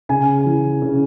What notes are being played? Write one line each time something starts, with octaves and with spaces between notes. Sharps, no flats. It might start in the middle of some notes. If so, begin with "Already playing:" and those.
C#3 G#5
E3
C#3